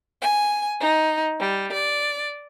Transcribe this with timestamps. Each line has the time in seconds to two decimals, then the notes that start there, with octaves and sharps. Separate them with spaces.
0.22 G#5
0.81 D#4
1.39 G3
1.73 D5